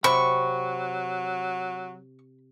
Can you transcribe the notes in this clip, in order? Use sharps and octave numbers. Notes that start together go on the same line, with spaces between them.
C3 F#3 C4 B5 C#6